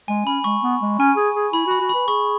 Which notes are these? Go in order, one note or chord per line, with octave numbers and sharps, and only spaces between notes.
G#3 G#5
C#4 B5
G#3 C#6
B3
G#3
C#4 G#5
G#4
G#4
E4 B5
F#4 B5
F#4
B4 B5
G#4 C#6